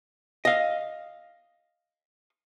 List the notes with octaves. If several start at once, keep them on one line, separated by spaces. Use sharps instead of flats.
D#5 F5